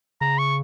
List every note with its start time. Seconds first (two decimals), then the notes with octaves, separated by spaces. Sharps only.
0.21 C#3 A#5
0.38 C#6